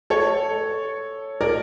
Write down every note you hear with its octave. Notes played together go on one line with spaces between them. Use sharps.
A4 C#5
A#4 D5